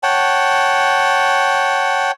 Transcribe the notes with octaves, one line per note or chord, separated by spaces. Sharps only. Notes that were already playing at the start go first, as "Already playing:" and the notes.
C#5 F#5 G5 A5